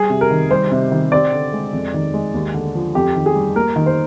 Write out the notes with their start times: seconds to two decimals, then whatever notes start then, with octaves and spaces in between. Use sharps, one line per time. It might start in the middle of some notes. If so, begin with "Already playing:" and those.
Already playing: G3 G#4
0.10 C3
0.21 A#4
0.31 D#3
0.51 G3 C5
0.72 C3
0.92 D#3
1.12 C4 D5
1.33 D3
1.53 G#3
1.73 F2
1.94 D#3
2.14 G#3
2.34 D#2
2.54 D3
2.75 F3
2.95 F2 G4
3.15 D#3
3.26 G#4
3.35 G3
3.56 A#3 A#4
3.76 D#3
3.86 C5